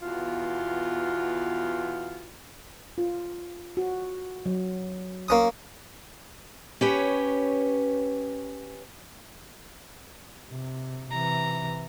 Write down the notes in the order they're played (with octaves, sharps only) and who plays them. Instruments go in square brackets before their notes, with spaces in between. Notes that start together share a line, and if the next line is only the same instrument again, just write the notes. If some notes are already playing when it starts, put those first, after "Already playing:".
[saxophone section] E2 B2 F4
[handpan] F4
F#4
F#3
[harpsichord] A#3 C#4 D#6
[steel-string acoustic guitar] C#4 G4 B4 C#5
[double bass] C3
[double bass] C3 E3 [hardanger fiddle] A#5